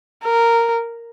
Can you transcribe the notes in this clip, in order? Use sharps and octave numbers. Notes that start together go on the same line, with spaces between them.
A#4